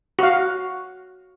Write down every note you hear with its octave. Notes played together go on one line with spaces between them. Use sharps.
F#4 F5